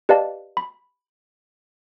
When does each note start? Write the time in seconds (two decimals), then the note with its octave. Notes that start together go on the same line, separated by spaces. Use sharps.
0.09 G4 B4 D5 D#5 F5 A5
0.57 B5